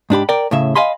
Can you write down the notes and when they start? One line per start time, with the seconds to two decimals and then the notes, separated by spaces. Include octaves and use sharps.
0.10 G#2 D4 G4 B5
0.29 A#4 D5 G5
0.51 A2 C#3 E5
0.75 D#5 F5 G#5 B5 C6